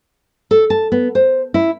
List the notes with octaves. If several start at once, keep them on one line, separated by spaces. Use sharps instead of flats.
A4
A5
B3
C5
E4